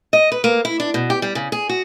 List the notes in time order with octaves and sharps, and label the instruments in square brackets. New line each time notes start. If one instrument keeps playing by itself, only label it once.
[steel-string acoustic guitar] D#5
B4
A#3
E4
D4
B2
G4
G3
C#3
G#4
F#4